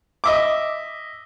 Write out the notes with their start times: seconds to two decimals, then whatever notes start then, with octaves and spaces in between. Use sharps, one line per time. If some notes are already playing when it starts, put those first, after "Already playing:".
0.24 D#5 E5 D6